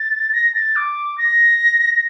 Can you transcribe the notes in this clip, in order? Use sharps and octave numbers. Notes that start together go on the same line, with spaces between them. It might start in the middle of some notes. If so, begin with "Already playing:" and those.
Already playing: A6
A#6
A6
D6
A#6